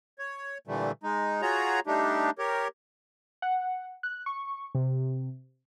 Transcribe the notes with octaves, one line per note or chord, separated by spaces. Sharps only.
C#5
A#2 D3 E3 G3 A3
G#3 D#4
F4 F#4 G#4 C#5 A#5
G3 A3 D4 D#4 G4
G4 A#4 C#5
F#5
F#6
C#6
C3